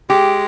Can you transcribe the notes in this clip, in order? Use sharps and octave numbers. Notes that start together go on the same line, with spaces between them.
G#3 G4